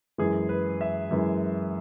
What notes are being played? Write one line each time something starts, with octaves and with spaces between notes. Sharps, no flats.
F#2 E3 G#3 G#4
B4
E5
F#2 E3 G#3